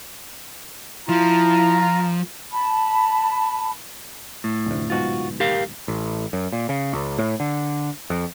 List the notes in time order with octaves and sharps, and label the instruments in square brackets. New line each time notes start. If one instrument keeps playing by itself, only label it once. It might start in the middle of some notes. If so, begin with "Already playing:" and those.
[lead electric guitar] F3 [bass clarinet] E4 [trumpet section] F4 A#5
[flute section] A5 B5
[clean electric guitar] A2
[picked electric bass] F1 D2
[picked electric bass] D1 G#2 B2 [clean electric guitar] F4 F#4
[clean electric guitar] G4 A#4 F5
[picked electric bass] A1
F#2
A#2
C#3
C#2
A2
D3
F2